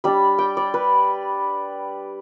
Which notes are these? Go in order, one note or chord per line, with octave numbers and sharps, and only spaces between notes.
G3 D4 B5
G5
D5
B4